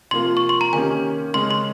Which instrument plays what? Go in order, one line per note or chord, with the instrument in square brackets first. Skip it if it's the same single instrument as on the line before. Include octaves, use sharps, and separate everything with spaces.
[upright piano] C3 F3 A#3 F4 [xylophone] C6
[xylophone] C#6
C6
A#5
[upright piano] D#3 A#3 C#4 G4 [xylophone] G#5
[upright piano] C#3 G#3 C#4 [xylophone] C6
[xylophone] C6